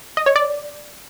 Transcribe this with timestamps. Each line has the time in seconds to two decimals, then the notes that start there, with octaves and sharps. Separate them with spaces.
0.17 D#5
0.26 C#5
0.36 D5